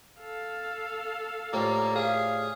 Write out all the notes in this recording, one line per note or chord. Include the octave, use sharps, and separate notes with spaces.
A4 F5
A2 F3 G3 A#3
G#4 F5